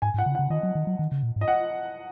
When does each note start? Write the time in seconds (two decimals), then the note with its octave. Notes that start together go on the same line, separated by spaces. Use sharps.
0.02 G#2 G#5
0.14 G#2
0.18 F#5
0.26 C#3
0.35 F#5
0.39 C#3
0.50 D#3 D#5
0.63 F#3
0.75 D#3
0.87 F#3
0.99 D#3
1.12 C#3
1.23 A#2
1.36 G#2
1.41 D#5
1.48 F#5